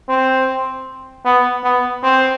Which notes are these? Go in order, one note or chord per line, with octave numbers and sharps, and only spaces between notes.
C4
B3
B3
C4